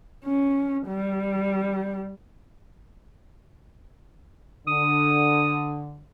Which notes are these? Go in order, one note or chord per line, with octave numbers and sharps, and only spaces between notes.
C#4
G3
D3 D#6